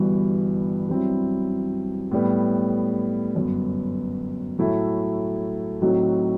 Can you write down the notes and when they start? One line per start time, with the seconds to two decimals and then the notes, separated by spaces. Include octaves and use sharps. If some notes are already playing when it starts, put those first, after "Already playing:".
Already playing: G1 G2 E3 B3 F#4
0.89 G2 F#3 C4 E4
2.11 A2 G3 B3
3.35 G1 F#2 F#3 B3
4.59 A2 F#3 A3 E4
5.82 A2 F#3 C4 D#4 F#4